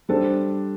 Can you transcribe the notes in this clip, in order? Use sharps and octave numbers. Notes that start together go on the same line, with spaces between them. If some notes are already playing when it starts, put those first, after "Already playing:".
G3 D4 A4 C5